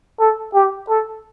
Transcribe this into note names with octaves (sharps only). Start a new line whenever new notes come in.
A4
G4
A4